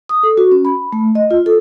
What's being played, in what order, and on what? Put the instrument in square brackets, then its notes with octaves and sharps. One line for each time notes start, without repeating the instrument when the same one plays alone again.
[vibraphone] D#6
A4
F#4
C#4
B5
A3
D#5
F4
A4